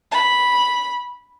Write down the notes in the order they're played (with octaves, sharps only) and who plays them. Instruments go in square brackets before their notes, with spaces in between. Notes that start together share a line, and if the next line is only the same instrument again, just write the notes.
[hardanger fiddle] B5